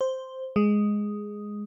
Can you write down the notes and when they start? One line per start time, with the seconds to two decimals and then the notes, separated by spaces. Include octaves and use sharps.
0.01 C5
0.56 G#3